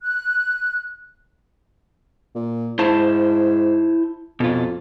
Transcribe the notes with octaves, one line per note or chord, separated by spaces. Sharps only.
F#6
A#2
G#2 E4 C5 A5
F2 B2 F4